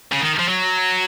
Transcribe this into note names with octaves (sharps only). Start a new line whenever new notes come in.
C#3
D#3
F3
F#3